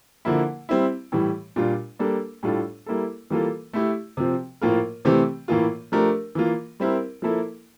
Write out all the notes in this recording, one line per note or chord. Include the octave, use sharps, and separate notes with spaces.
D3 F3 A#3 E4
G3 C4 E4
A2 E3 G3
A#2 G3 D4 F4
G3 A#3 D4 A4
A2 G3 D4 F4 A4
G3 A#3 E4 A4
E3 G3 A#3 F4 A4
A3 E4 G4
C3 F3 C4
A2 F3 A#3 F4 A#4
C3 E3 A3 C4 G4
A2 E3 A#3 F4
F3 A3 D4 G4 A#4
E3 A#3 F4
G3 C4 E4 A#4
F3 A#3 E4 A4